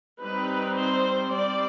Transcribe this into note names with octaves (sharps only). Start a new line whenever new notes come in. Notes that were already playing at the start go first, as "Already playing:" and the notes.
G3 C4 D#4 B4
C5
G3 C4 D5